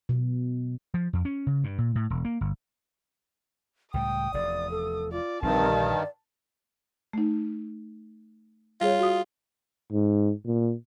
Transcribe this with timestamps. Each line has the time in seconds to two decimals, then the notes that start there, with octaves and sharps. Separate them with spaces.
0.09 B2
0.94 F3
1.13 F2
1.25 C#4
1.47 C#3
1.64 G2
1.78 A#2
1.95 A2
2.10 E1
2.25 A#3
2.41 G1
3.94 C#2 A2 G3 G5 D#6
4.34 F1 E2 D5
4.71 A4
5.12 F4 D5
5.42 A#1 G2 A#2 D3 D#3 C4 A5
5.75 D5
7.13 A3 D#4
8.81 G3 F4 G#4 C#5
8.99 F#4 D#6
9.92 G#2
10.46 A#2